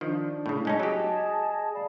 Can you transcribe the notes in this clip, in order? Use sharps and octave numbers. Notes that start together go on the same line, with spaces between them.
D#3 F3 D4
A2 C#3
G#3 C#4 D#4 G#4 D#5 A5
F#3 G4
D5 F5 B5